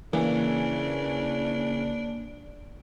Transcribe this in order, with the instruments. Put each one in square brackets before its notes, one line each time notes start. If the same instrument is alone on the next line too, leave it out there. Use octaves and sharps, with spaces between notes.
[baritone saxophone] C#3 [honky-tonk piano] E3 [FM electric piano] A#3 [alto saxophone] D4